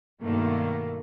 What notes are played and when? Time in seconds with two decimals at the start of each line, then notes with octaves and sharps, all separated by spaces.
0.22 G2 B2 D#3 A3 A#3